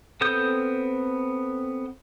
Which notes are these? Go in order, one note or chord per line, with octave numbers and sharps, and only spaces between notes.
B3 C4 A4 D#6 G6